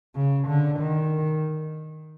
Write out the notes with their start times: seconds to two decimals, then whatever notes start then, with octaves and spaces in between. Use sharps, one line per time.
0.16 C#3
0.48 D3
0.80 D#3